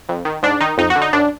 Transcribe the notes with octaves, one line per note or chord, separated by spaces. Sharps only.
F2
D#3
G#2 D4
D#3 D#4
F2 D#4
F#4
D3
D#4
F#2 D4